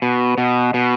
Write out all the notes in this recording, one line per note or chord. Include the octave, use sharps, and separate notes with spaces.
B2
B2
B2